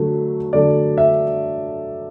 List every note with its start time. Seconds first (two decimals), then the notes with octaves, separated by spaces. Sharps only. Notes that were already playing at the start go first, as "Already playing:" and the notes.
Already playing: D3 F#3 A3
0.53 D3 F#3 A3 D5
0.98 E5